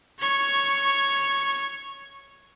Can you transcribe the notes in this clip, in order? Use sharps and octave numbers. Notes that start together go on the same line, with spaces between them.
C#5 C#6